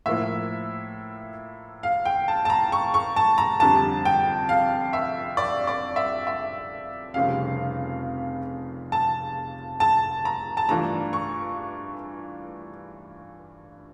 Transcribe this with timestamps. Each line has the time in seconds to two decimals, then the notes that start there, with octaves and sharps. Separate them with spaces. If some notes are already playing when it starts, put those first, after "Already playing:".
0.06 A2 F3 A#3 E4 E5
1.83 F5
2.05 G5
2.28 A5
2.45 A5
2.50 A#5
2.72 C#6
2.94 C#6
3.16 A5
3.38 A#5
3.60 F2 D3 G3 A5
4.05 G5
4.49 F5
4.93 E5
5.37 D5
5.67 D5
5.96 E5
6.27 E5
7.14 F1 F2 C#3 G3 C#4 F5
8.92 A5
9.80 A5
10.25 A#5
10.57 A5
10.68 G2 E3 A3 D4 F4 A#5
11.13 C#6